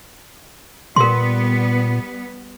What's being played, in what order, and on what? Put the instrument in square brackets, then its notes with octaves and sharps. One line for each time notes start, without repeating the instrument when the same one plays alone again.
[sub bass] A#2 [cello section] G3 B3 [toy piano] A#4 C6